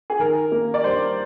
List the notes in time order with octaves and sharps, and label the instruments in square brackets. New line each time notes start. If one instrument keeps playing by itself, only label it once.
[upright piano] G#4
D#3 A#4
A#3
D5
G2 C5